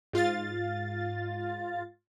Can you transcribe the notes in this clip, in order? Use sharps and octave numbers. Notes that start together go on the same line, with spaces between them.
G#2 F4 F5 A6